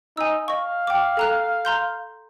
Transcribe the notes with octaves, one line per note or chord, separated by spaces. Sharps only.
D#4 G#5 E6
D#5 F5 C#6
G5 D6
A4 A#5 F#6
A#5 C6 G6